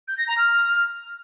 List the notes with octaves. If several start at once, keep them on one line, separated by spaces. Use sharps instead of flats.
G6
A#6
A#5
F6